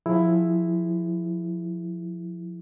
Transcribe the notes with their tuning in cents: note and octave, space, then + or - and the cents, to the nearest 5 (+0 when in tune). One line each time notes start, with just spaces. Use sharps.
F3 +20 E4 +5 G#4 +0